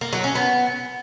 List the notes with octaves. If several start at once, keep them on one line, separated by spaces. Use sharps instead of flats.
A#3
F#3
C#4
B3